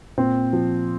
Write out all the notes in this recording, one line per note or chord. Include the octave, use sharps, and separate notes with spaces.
A#2 C4
F3